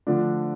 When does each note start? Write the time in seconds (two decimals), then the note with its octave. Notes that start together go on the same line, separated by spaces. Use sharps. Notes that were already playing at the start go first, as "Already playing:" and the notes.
0.07 D3 F3 A3 D4